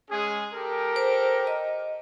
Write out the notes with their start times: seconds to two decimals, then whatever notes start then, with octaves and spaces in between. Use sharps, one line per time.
0.11 G#3 C#4 G#4
0.54 G4 A4 A#4
0.96 C5
1.47 D#5